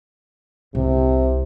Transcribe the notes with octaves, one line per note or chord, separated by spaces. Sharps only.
C2 C3